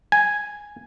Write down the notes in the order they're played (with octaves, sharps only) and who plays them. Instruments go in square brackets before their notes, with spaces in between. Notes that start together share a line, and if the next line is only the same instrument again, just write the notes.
[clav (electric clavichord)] G#5